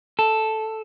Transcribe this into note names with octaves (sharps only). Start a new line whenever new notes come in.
A4